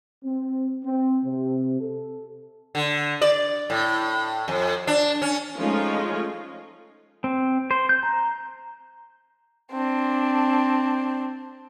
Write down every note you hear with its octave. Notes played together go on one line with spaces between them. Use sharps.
C4
C4
C3
A4
D3
D5
A2
F2
D4
C#4
F3 G#3 A3 C#4 D#4 F4
C4
C5
G6
A#5
C4 D4